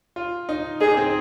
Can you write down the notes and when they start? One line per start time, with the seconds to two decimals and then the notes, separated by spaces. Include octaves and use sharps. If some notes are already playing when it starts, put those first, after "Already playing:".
0.16 F4
0.49 D#4
0.80 D#4 G#4
0.97 C4